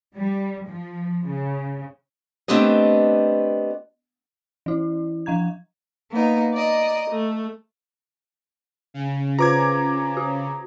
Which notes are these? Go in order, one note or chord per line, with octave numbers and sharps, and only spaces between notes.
G3
F3
C#3
A3 B3 C4 D4 G4 D#5
E3 E4
F3 F5 A#5 G#6
A#3 B3 D#4
D5 D#5 A#5
A3
C#3
F4 B4 C5 A#5 D6 G#6
F#4